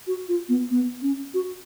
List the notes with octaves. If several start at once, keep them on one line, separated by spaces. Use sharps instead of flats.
F#4
F4
B3
B3
C#4
F#4